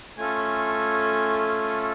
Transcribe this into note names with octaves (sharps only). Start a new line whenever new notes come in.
A3 C#4 F4 A4 G#5